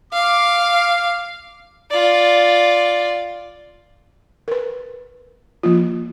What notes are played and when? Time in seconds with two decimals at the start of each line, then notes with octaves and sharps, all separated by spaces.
0.13 F5 D6
1.90 F4 D5
4.48 A#4 B4
5.63 F3 A#3 F4